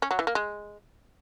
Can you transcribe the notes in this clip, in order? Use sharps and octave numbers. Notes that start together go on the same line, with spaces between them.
C#4
F#3
E3
A#3
G#3